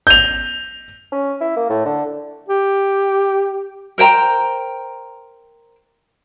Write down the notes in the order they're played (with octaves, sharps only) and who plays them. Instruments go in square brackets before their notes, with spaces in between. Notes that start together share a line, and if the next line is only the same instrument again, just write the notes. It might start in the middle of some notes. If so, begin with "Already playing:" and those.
[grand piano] G6 F7
[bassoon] C#4
E4
A#3
A2
D3
[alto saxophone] G4
[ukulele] A#4 C5 G5 A#5